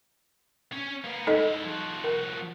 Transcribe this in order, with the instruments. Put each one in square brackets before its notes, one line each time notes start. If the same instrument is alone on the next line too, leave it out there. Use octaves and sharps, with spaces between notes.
[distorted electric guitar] C#4 C#5
A#3 B3
[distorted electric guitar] G#3 E4 [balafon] D#4 A4 D#5
[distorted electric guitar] F3 F#4
[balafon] A#4